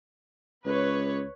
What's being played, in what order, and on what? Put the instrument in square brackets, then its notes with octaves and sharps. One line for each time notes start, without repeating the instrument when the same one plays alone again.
[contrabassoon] C#2 [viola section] B4 C#5